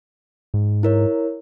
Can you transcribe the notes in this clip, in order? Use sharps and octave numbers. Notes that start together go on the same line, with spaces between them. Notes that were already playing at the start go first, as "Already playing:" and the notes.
G#2
E4 A#4 C#5